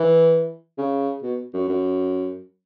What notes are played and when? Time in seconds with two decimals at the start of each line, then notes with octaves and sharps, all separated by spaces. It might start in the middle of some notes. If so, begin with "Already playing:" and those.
Already playing: E3
0.78 C#3
1.23 B2
1.54 F#2
1.69 F#2